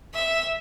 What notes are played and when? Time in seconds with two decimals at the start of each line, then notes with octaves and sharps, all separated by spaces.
0.14 E5